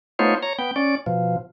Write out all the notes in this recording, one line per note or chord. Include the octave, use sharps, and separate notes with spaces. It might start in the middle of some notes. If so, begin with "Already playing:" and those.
A3 B3 D#4 F4 C5 C#5
C#5 A#5
B3 G5
C#4 D5
B2 F3